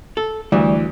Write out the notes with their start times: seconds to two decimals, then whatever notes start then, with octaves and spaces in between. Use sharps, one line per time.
0.17 A4
0.52 D2 E3 G3 D5